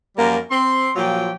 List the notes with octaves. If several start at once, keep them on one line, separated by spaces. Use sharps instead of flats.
F#2 F3 G3 A#3 A#4
C4 C6
A#2 F3 F#3 F4 G4 G5